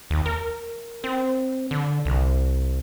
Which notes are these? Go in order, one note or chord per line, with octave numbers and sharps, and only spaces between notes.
D#2
A#4
C4
D3
C2